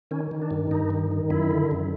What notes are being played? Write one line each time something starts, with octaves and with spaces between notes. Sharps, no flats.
D#3 C#4
D#3
D4
G2
G2 D#4
D#3
D#3
F#2 E4
D3
F#2